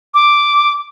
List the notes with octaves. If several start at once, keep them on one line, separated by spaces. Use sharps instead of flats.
D6